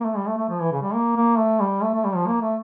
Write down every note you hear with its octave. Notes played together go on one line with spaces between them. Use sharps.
A#3
A3
G3
A3
A3
F3
E3
C#3
G3
A#3
A#3
A3
G3
A3
A3
G3
F3
A#3
A3